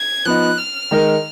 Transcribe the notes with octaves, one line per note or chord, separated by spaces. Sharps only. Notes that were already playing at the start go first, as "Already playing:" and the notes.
Already playing: G#6
F3 B3 D#4 F#6
F6
D#3 G#3 D#4 A#4 D#5